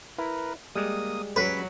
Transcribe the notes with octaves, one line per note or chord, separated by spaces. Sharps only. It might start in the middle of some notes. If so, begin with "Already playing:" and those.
E4 A#4 B4
G3 G#3 A#3 D#6
F#3 C#4 B4